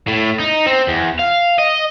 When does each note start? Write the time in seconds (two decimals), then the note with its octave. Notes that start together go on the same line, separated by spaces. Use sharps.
0.07 A2
0.40 D#4
0.66 C4
0.88 E2
1.19 F5
1.58 D#5